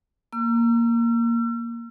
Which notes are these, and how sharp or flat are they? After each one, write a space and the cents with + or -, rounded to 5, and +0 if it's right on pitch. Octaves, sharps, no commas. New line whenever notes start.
A#3 +0 E6 +45